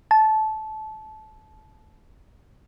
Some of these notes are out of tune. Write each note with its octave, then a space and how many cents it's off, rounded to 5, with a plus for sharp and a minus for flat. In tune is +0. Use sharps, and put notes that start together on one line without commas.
A5 -20